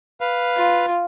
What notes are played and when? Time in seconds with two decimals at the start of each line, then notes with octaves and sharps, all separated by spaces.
0.21 B4 F5
0.57 F4